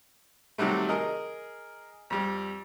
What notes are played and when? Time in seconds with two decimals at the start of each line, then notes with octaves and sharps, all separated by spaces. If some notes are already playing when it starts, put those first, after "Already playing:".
0.58 C3 D#3 F#3 G3 A3
0.89 G#4 A#4 D#5
2.10 F2 G3